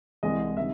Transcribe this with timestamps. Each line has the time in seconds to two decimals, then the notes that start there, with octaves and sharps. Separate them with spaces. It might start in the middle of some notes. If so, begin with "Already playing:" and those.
0.23 C2 C3 E3 G#3 D#5
0.57 C3 D#3 G3 E5